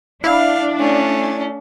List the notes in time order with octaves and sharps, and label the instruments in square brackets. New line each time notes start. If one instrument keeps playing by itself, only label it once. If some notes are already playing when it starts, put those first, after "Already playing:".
[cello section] D4 [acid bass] E4 [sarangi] F5
[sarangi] A3 [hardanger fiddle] C#4